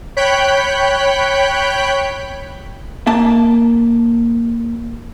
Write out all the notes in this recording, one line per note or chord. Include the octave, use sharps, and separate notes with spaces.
C#5 G5 B5 F#6 G6 B6
A#3 A5